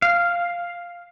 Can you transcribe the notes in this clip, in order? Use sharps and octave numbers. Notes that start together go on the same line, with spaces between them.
F5